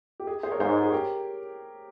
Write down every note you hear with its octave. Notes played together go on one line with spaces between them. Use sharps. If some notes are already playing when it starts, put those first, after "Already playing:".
G4
G#4
G#4 C5
A#4 C#5
G#2 G#4 C5
G#4
G4 A#4